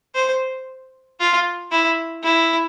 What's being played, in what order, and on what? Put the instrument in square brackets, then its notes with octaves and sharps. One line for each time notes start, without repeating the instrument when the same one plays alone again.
[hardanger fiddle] C5
F4
E4
E4